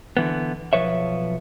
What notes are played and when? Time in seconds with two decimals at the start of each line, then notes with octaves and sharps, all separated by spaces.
0.17 D3 E3 B3
0.73 B1 F3 B4 C#5 E5